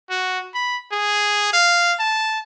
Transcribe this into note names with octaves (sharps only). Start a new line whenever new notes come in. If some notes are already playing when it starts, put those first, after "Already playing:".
F#4
B5
G#4
F5
A5